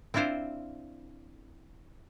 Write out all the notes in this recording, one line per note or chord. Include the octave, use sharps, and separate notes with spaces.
C4 D4 E4 F4 C5